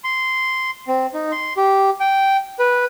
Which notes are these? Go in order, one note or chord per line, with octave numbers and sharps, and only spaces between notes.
C6
C4
D#4
C6
G4
G5
B4